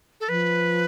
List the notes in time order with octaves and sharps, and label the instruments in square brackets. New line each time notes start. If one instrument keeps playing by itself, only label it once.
[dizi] A4
[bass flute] F3 [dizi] B4